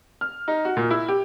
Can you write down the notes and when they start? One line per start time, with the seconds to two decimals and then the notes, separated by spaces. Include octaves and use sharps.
0.21 F6
0.48 D#4
0.65 F#4
0.77 A#2
0.91 E4
1.08 G4